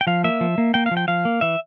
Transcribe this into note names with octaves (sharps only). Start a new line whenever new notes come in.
G5
F3 F5
A#3 E5
F3
A#3
A#3 G5
F5
F3
G5
F3 F5
A#3
E3 E5